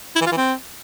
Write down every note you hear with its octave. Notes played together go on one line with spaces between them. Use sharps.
E4
E3
F4
E3
C4